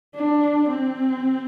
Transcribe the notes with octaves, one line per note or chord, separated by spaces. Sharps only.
D4
C4